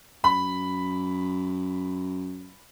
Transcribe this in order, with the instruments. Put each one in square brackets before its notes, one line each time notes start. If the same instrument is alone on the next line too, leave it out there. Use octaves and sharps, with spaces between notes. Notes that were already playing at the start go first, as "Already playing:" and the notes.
[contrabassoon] F#2 [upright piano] B5